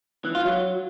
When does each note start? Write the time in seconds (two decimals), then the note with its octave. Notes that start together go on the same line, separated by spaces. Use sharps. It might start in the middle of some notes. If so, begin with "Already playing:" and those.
0.25 E3
0.35 F4
0.45 F#3